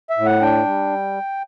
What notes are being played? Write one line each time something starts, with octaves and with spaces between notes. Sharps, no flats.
E5
A2
F#5
D4 G5
G3